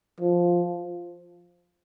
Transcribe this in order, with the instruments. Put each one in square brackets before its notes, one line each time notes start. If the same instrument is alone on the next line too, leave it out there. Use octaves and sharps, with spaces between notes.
[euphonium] F3